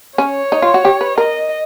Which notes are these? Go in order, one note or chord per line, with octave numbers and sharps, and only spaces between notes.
C#4 C#5
D#4
F4
F#4
G4
B4
A#4 D#5